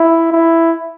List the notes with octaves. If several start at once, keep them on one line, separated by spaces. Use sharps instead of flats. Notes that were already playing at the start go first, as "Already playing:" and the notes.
Already playing: E4
E4